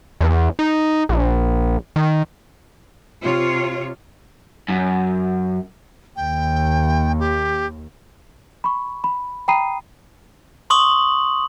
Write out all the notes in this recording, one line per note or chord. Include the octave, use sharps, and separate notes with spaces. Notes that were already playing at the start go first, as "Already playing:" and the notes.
E2
D#4
A#1
D#3
C3 F4 C#5
F#2
D#2 G5
G4
B5 C#6
B5
G5 A#5 B5 D#6 C7 D#7
C6 C#6 D#6 F#7